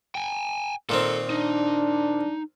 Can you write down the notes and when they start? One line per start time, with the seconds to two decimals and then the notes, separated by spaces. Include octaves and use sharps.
0.15 G5 G#5
0.89 A#2 D#3 C4 A4
1.30 D4 D#4